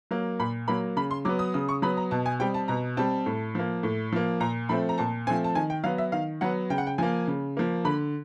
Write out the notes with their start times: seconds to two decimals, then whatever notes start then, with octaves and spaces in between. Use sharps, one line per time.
0.11 F#3 A#3
0.40 A#2 B5
0.68 F#3 A#3 B5
0.96 C#3 B5
1.11 C6
1.25 F#3 B3 D6
1.39 D#6
1.54 C#3 D#6
1.69 C#6
1.82 F#3 B3 B5
1.97 A#5
2.11 B2 A5
2.26 G#5
2.39 G3 C4 G5
2.54 A5
2.68 B2 A#5
2.97 G3 C4 A5
3.26 A2
3.55 F3 A#3
3.83 A2
4.13 F3 A#3
4.40 A#2 A#5
4.69 F3 A3 C4 B5
4.89 A#5
4.98 A#2 A5
5.27 F3 A3 C4 G#5
5.44 A5
5.55 D#3 G#5
5.70 G5
5.84 F#3 B3 F5
5.98 E5
6.12 D#3 F5
6.41 F#3 B3 F#5
6.70 C#3 G5
6.78 F#5
6.87 G5
6.98 F3 A#3 G#5
7.27 C#3
7.57 F3 A#3
7.85 D3 B5